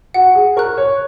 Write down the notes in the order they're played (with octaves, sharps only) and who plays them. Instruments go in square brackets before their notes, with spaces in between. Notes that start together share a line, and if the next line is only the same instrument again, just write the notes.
[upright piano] F#4 [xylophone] F#5
[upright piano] G#4
[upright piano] A#4 [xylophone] C#6 F#6
[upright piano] C#5